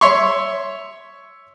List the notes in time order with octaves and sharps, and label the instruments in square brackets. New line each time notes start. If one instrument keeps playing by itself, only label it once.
[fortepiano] C#5 E5 C6 C#6